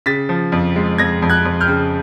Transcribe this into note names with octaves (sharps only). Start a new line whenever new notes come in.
C#3 A6 B6
F3
F2
G#3
F2 G#6 A#6
F2
F#6 G#6
F2
F6 G6
C#3